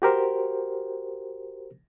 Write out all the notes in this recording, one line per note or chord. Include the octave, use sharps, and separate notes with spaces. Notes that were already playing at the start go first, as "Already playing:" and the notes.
F#4 G4 A#4 C5